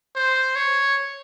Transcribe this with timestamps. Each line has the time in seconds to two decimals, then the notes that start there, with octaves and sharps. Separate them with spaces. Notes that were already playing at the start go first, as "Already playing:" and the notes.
0.16 C5
0.55 C#5